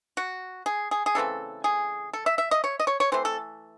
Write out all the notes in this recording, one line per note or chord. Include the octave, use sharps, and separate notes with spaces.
F#4
G#4
G#4
G#4
C#3 E3 A3 C4 A4
G#4
A4
E5
E5
D#5
C#5
D#5
C#5
C#5
E3 A3 C4 C5
A4